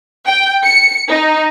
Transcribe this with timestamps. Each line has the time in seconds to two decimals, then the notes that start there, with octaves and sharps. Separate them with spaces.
0.26 G5
0.63 C#7
1.10 D#4